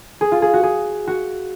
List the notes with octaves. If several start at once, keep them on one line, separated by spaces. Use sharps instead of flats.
G#4
F4
G#4
F#4
G#4
F#4